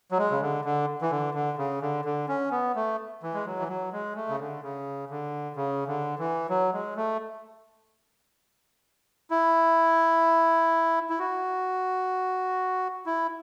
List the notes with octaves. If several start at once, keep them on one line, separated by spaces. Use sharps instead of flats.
F#3
G#3
C#3
D3
D3
E3
D3
D3
C#3
D3
D3
C#4
B3
A3
E3
G#3
F#3
E3
F#3
G#3
A3
C#3
D3
C#3
D3
C#3
D3
E3
F#3
G#3
A3
E4
E4
F#4
E4